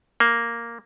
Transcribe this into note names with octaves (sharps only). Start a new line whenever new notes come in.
A#3